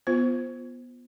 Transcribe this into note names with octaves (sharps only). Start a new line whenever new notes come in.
B3 F4 C5